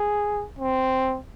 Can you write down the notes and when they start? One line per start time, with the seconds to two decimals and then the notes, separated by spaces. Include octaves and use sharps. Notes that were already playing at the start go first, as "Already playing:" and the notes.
Already playing: G#4
0.59 C4